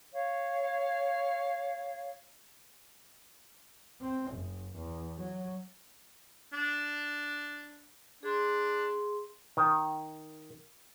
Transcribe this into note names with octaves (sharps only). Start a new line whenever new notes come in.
C#5 F5
C4
F#1
E2
F#3
D4
D4 G#4 C6
D#3